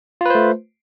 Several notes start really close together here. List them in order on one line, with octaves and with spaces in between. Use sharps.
F4 B4 C5 A3